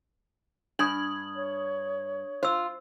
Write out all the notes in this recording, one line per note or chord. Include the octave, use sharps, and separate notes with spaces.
G2 D4 D#6 G#6 F#7
C#5
F4 C5 E6